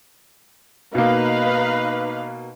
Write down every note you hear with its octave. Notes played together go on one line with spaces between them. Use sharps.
B2 A#3 D#4 B4 F5